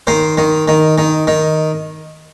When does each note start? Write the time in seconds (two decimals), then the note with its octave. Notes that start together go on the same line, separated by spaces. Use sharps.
0.07 D#3 C5
0.37 D#3
0.68 D#3
0.98 D#3
1.27 D#3